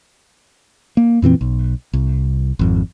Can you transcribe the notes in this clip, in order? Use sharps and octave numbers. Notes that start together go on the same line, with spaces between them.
A#3
F2 A#2 E3 C4
B1
C2
G#1 F2